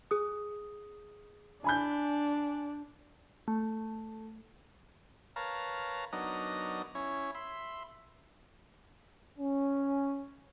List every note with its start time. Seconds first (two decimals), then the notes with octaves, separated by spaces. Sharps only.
0.11 G#4 D#6
1.64 D4 G#5 B5 G6
3.48 A3
5.36 A#4 B4 C#5 F5 A5 A#5
6.13 F#3 B3 D4 D#4 A#4 D#5
6.95 C#4 E4 C#5
7.35 E5 B5 C6
9.38 C#4